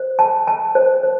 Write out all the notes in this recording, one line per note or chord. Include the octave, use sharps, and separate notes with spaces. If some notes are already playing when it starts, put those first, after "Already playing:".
Already playing: C5
A5
A5
C5
C5